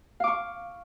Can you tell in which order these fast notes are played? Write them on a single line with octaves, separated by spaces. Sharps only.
F5 D6 C#6